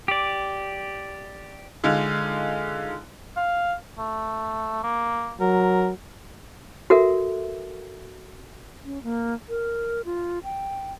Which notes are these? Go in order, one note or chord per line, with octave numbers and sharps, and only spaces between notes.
G4 D5
D3 G#3 D#4 F4
F5
A3
A#3
F#3 A#4
F#4 A4 A#4 E5
C#4
A#3
A#4
F4
G5